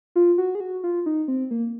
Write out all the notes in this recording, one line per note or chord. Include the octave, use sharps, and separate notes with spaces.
F4
F#4
G#4
F#4
F4
D#4
C4
A#3